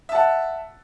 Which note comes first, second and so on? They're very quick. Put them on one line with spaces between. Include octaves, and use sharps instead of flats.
E5 A5 F#5